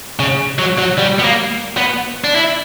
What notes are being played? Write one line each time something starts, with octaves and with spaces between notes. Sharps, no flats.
C#3
F#3
F#3
G3
B3
A#3
B3
D4
E4